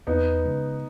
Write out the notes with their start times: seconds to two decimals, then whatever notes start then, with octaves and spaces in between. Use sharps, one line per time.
0.07 E2 B3 D#4
0.46 C#3 G#3